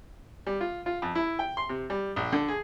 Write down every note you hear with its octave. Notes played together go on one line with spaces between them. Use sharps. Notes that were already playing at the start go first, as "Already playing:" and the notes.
G3
F4
F4
F2
E4
G5
C6
C3
G3
A#1
D3
G#4